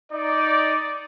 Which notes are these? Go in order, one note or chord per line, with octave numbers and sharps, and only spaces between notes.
D#4 D5